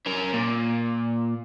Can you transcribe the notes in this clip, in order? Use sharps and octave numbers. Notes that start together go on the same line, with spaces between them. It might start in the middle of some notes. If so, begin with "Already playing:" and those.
C#4 A#4
A#2